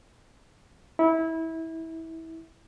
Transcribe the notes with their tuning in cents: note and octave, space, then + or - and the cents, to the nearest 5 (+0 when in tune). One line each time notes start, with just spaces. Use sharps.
E4 -25